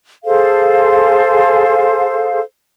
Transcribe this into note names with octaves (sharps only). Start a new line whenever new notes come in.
G#4 A4 C5 F5